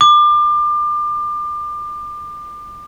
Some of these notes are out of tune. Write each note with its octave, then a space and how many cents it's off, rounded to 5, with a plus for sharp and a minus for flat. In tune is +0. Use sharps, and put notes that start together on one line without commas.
D6 +30